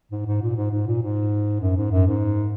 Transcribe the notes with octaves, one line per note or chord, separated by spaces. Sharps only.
G#2
G#2
A#2
G#2
G#2
A#2
G#2
F#2
G#2
F#2
G#2